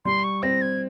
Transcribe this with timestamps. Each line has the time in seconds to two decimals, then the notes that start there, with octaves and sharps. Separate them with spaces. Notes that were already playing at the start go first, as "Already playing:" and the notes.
0.05 G3 C6
0.24 C#6
0.43 C4 A#6
0.62 G#6